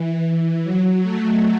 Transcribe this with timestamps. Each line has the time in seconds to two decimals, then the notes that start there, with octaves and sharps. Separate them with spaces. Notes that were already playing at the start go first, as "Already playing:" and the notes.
Already playing: E3
0.64 F#3
1.02 A3